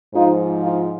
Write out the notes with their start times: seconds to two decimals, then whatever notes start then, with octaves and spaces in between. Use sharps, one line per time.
0.15 G#2 F3 D#4 F4
0.62 D#4 F4